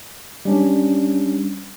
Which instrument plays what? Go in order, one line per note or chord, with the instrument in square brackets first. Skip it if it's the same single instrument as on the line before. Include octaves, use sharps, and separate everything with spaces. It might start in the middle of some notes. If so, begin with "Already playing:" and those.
[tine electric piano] G3 C#4 D4